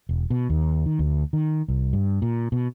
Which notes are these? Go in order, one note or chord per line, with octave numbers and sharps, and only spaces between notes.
E1
B2
D#2
D#3
D2
D#3
C2
G2
A#2
B2